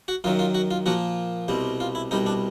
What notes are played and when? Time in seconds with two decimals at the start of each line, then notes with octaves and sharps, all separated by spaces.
0.08 F#4
0.24 F#2 D#3 F#3 F4
0.39 F4
0.55 F#4
0.71 F4
0.86 A#2 F3 A#3 F#4
1.48 C2 B2 G3 C4
1.80 F4
1.95 E4
2.11 C2 B2 G3 D#4
2.26 D4